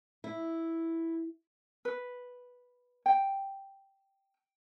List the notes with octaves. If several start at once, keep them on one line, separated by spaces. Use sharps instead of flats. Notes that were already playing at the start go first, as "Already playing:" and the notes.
E4
B4
G5